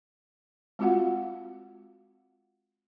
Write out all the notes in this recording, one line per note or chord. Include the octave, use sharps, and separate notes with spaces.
G#3 C4 F4 F#4 F5 F#5